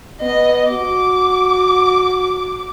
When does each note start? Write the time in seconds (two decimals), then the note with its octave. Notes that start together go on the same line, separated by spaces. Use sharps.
0.22 B3 D#5
0.71 F#4 D6